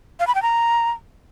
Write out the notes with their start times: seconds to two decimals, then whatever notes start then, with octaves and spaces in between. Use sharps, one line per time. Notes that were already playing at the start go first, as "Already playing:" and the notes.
0.20 F5
0.27 B5
0.35 G5
0.42 A#5